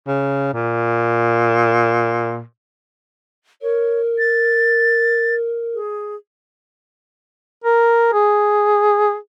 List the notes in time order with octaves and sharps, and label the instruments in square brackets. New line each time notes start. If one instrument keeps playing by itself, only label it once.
[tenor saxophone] C#3
A#2
[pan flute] A#4 [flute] C#5
[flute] A6
G#4
[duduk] A#4
G#4